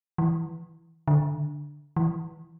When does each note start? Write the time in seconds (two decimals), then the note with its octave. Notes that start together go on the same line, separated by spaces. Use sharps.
0.18 E3
1.08 D3
1.96 E3